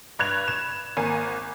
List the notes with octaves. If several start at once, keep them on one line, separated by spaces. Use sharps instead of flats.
G2 F#6 G#6 F7
E7
G#1 A#3 G#5